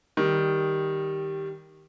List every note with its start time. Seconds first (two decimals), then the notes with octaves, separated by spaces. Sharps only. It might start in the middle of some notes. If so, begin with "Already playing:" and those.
0.17 D#3 G3